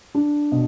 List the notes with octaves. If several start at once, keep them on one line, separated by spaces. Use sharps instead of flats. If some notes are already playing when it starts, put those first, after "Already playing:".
D4
B2